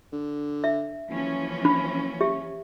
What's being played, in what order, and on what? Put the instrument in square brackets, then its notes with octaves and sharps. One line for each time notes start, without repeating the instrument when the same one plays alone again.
[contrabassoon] D3
[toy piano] E5
[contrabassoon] F#1 [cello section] E3 F3 C#4
[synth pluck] D4 [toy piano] B5
[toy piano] G4 E5